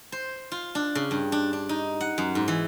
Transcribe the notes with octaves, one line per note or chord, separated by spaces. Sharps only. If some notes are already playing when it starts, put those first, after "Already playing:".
C5
F4
D4
C#3
G2
D4
D4
D#4
F#5
F#2
G#2
E3